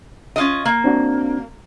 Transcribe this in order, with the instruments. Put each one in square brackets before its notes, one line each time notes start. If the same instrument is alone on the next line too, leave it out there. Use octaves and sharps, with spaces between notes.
[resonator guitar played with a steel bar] C#4 F4 D#5
A#3
[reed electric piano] C4 D4 F#4